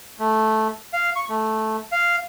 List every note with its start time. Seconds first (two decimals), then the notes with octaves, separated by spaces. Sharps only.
0.19 A3
0.93 F5
1.16 C#6
1.29 A3
1.92 F5